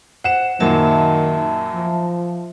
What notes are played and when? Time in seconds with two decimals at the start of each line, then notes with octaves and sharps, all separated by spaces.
0.24 C5 F#5 E7
0.60 F#2 A#2 D#3 F#3 E5 A5
1.73 F3